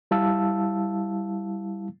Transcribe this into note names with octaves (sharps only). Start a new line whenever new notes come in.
G3 E4 F5 A5 E6